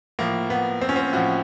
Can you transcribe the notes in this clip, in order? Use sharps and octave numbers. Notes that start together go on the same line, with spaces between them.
A2 F3 A#3
B3
C4
C#4
C4
A2 F3 F#4